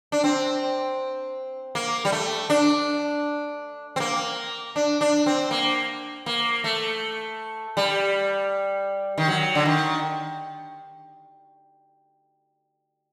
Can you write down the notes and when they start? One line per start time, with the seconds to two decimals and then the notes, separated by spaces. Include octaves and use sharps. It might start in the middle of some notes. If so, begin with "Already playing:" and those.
0.12 D4
0.24 C4
1.75 A#3
2.05 G3
2.12 A3
2.50 D4
3.96 C4
4.00 A#3
4.76 D4
5.01 D4
5.26 C4
5.51 A#3
6.26 A#3
6.64 A3
7.77 G3
9.18 D#3
9.28 F#3
9.55 D3
9.65 D#3